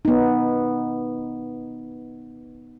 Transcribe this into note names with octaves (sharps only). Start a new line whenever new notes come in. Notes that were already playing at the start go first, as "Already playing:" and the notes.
B3 D#4